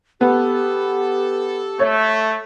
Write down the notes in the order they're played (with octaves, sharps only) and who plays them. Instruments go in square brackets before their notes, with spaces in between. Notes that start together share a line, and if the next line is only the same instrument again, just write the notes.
[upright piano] B3 [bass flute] G4 [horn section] A4
[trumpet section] A3 [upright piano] C#5